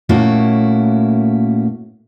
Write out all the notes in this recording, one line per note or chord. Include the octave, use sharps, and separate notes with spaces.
A#2 A3 A#3 C#4 E4 F#4